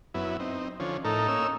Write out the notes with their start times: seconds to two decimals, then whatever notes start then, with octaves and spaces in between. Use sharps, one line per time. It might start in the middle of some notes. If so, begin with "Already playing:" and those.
0.14 F#2 B3 E4
0.40 C4 D#4
0.80 D3 F3 C#4
1.04 A2 D#4 A4 A#4
1.28 A#3 C#4 E6